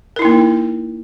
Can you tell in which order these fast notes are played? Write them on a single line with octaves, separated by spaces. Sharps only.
A#4 E4 D#4 A#3